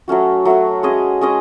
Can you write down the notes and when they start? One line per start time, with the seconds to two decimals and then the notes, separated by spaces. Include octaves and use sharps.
0.08 F#3 A3 C#4 F#4
0.45 F#3 A3 C#4 F#4
0.83 G#3 C#4 G#4 D#5
1.21 G#3 C#4 G#4 D#5